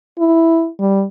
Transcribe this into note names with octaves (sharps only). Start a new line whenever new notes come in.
E4
G3